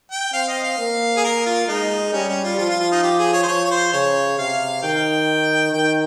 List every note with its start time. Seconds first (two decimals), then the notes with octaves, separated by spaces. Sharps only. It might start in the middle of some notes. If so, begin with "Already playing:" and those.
0.11 G5
0.33 C4 F5
0.48 D#5
0.63 F5
0.78 A#3
1.17 G#4
1.24 A#4
1.46 F4
1.68 G#3 D#4
2.13 G3 C#4
2.29 C#4
2.44 F4
2.58 F3 F4
2.69 F4
2.80 F4
2.92 D#4
3.03 G4
3.19 G#4
3.33 C#5
3.43 C5
3.48 F3 C#5
3.65 C#5
3.71 C5
3.94 C#3 C#5
4.38 C3 F5
4.83 D#3 G5
5.73 D#3 G5